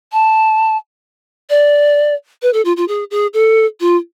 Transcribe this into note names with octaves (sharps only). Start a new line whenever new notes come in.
A5
D5
B4
A4
F4
F4
G#4
G#4
A4
F4